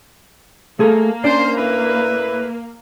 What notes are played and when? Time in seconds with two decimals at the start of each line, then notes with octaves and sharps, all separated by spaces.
0.79 A3 A#3 G#4 A4
1.24 C#4 D4 C5 D5
1.56 A2 E4 B4